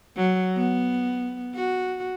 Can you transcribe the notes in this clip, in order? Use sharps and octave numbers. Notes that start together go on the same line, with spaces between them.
F#3
B3
F#4